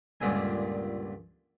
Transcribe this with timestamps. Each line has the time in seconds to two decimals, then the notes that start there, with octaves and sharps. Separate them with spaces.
0.21 C#2 G2 A#2 D3 G#5